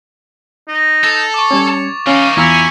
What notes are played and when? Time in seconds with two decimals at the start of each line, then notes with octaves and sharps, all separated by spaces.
0.68 D#4
1.04 A4 A6 F7
1.34 C#6 D6
1.51 G3 C#4 C#5
2.07 E3 C#4 D#4 F5
2.37 E2 C#4 E4 F4 A#5